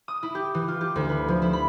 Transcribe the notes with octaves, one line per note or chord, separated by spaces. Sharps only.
D#6
E4
G4
E3
F4
G4
D2
B4
F3
E4
B5